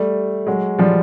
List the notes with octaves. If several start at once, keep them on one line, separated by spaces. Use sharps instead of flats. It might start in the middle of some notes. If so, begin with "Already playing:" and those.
Already playing: G3 A3
F#3 G#3
F3 G3